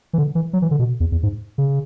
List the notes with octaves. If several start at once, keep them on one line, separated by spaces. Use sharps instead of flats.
E3
D3
E3
F#3
E3
D3
B2
E2
E2
G#2
C#3